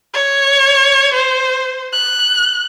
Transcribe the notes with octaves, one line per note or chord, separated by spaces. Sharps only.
C#5
C5
F#6